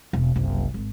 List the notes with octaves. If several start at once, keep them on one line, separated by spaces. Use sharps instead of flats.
E1
F#1 C2
G#1